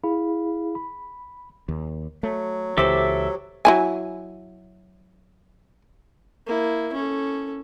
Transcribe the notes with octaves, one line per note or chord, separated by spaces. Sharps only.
E4 G#4 F5 B5
B5
D#2
F#3 A3
C#2 E3 G4 A4 C5 E5 D6
F#3 E4 G#5
A#3 E4
C#4 A4